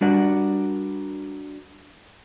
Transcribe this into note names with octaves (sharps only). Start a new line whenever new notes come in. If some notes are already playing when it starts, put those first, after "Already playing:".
G3 D4 F#4 A#4 D5 F#5